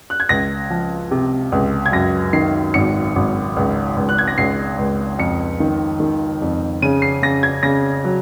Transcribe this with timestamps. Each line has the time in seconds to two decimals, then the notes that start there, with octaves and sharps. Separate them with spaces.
0.10 F#6
0.20 G#6
0.29 C#2 A#6
0.70 F3
1.11 C3
1.52 C#2
1.86 G#6
1.92 F#2 A#6
2.33 D#3 C7
2.74 G#1 C#7
3.16 G#1
3.57 C#2
3.96 C#2
4.09 F#6
4.18 G#6
4.28 A#6
4.38 C#2 C7
4.79 C#2
5.19 F2 C#7
5.60 D#3
6.00 D#3
6.42 F2
6.82 C#3 D#7
7.02 C7
7.22 C#3 A#6
7.43 G#6
7.63 C#3 A#6
8.05 F#3